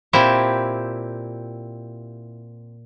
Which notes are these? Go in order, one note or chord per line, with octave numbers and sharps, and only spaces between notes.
A#2 C4 E4 G4 E5